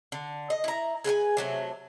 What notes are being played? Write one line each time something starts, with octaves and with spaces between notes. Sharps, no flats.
D3
D#5
E4 A#5
G#4 B4 G5 G#5
C3 F#3 A3